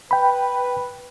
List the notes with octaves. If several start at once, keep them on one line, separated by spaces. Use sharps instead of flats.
B4 G5 B5